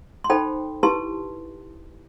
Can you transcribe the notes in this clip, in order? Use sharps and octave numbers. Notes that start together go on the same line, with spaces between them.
C6
D#4 A4 C5 G5 B5
E4 G4 B4 A5 C6